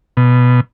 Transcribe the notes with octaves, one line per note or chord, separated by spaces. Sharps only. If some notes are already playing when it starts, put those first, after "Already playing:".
B2